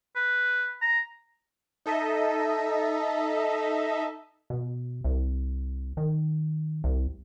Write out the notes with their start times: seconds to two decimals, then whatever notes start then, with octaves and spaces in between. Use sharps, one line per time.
0.16 B4
0.82 A#5
1.86 D#4 A4 D#5 E5
4.50 B2
5.04 C2
5.97 D#3
6.84 C2